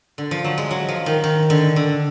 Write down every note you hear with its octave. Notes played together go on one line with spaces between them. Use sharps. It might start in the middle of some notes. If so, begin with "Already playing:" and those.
D3
F3
F#3
G#3
F#3
F3
D#3
D#3
D3
D3